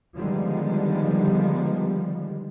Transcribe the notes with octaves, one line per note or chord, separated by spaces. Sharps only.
D3 D#3 F3 G3 G#3 B3